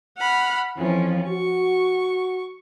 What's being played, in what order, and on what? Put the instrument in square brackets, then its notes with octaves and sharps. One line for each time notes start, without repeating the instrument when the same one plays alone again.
[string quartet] F#5 B5 F6
[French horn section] F2 E3 [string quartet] F3 C#4
[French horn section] F#4 [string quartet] C#6